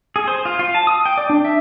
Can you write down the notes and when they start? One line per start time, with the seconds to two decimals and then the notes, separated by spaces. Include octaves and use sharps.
0.16 G#4
0.28 C5
0.45 F4
0.59 F4
0.75 A5
0.87 D#6
1.05 G5
1.18 D5
1.30 D4
1.45 E5